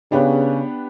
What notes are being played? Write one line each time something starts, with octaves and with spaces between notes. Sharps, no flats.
C#3 B3 D4 G4 B4